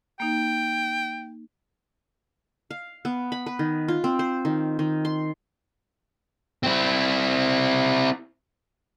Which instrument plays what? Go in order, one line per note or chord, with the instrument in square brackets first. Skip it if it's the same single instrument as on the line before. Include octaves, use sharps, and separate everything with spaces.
[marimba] A#3 D#4 [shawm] G5
[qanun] F5
B3
B5
B4
D#3
F4
C4
C5
D#3
D#3
C6
[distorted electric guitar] C4 E4